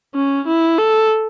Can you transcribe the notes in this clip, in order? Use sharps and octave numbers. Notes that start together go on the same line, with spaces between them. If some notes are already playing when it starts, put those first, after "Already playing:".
C#4
E4
A4